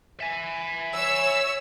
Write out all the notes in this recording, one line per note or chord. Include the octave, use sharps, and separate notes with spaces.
E5 G#5
C#5 E6